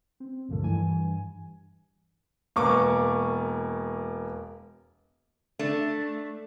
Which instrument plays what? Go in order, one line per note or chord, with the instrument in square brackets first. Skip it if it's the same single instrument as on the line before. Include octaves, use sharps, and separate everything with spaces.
[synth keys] C4
D2 G2 A#2 F3 A3
G2 E3 G#5
[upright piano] E1 A#3 B3 C#6 D6
[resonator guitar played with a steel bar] A3 D4